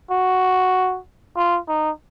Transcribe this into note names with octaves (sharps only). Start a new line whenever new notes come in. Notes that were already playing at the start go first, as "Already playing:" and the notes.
F#4
F4
D#4